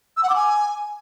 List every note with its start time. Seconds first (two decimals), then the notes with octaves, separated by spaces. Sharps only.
0.17 E6
0.23 F#5
0.30 D6
0.36 G#5